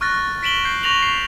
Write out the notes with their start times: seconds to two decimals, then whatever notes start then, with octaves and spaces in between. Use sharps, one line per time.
0.01 C#6 F6 F#6 A6 A#6
0.43 B6 D7 E7 F#7 G7
0.65 G6 C7
0.83 C#6 A#6 F7 F#7
1.02 C7